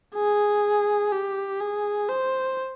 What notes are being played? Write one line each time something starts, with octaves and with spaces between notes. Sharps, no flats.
G#4
G4
G#4
C5